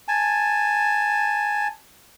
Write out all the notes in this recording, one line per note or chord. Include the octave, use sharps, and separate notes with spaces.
G#5 A5